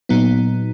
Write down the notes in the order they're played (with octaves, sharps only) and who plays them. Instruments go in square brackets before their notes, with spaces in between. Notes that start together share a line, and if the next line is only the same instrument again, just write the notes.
[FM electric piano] A#2 F#3 B3 D#4